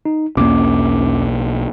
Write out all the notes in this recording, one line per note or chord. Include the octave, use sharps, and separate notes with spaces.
D#4
B1 E2 A#3 C#4 D6